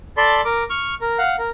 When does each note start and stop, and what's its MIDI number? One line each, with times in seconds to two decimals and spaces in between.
0.17 0.41 69
0.17 0.41 74
0.17 0.41 81
0.17 0.41 83
0.17 0.41 84
0.45 0.64 70
0.45 0.64 86
0.70 0.94 85
0.70 0.94 89
1.01 1.18 70
1.18 1.36 77
1.18 1.36 78
1.39 1.50 70